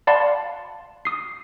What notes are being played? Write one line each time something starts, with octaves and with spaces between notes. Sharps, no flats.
D5 F5 F#5 A5 B5 C6
D#6 C7